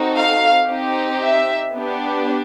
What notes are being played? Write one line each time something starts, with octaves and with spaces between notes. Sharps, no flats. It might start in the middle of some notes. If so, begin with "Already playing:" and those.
Already playing: C4 D#4 F#4 A4
F5
C4 D#4 G4
E5
B3 D4 G4